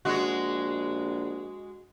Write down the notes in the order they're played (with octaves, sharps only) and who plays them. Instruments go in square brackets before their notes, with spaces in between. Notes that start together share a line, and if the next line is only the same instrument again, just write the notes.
[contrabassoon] A#1 [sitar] G#3 F#4